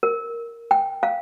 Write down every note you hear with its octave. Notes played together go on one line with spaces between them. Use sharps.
A#4
G5
F5